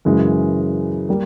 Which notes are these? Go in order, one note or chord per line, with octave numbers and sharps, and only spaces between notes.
F#2 C#3 E3 G#3
G3 A#3